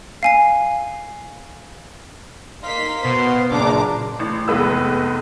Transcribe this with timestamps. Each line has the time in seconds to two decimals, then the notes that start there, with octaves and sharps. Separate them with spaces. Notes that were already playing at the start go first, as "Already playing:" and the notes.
0.23 F5 G#5 C7
2.63 A#3 D#4 F5 C6 B6
3.05 B2 B3 C5
3.52 F#2 A#2 C#3 D4 A#5 D6
4.19 A1
4.48 F1 E2 G#3 B4 E6